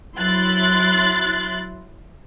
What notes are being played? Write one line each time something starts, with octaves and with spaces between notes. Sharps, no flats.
F#3 E4 C6 F#6 A6